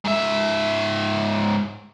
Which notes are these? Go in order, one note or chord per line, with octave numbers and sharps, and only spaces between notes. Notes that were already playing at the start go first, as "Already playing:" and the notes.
G#2 E5